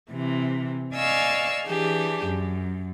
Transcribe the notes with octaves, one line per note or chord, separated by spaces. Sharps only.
C3 E3
D5 D#5 F5 G#5 C#6 E6
E3 D4 G4 G#4
F#2